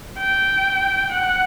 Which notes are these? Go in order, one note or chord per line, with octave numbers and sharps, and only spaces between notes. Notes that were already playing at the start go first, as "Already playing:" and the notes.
G5
F#5